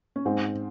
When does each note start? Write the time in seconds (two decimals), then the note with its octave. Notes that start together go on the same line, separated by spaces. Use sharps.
0.16 C#4
0.25 G#2 C4